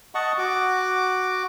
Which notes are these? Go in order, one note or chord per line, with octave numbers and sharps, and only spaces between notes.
D#5 F#5 A5 C#6
F#4 D6